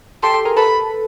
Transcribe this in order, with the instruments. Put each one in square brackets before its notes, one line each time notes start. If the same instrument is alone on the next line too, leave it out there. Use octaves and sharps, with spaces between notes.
[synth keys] G4 A4 [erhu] C6
[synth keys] G4 A4
G#4 A#4
[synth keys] A4 B4 [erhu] B5